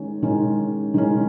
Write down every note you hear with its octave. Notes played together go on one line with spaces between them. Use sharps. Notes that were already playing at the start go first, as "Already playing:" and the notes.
Already playing: D#3 G#3 C#4
D#3 G#3 C#4
D#3 G#3 C#4